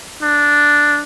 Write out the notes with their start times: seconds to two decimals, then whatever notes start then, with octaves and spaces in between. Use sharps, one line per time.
0.23 D4